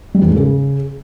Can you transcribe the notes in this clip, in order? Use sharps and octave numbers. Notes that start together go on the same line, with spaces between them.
G3
E2
G#2
C#3